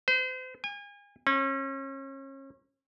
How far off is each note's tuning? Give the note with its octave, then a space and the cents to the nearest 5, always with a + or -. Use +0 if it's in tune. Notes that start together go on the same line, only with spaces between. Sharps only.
C5 -35
G#5 -35
C#4 -35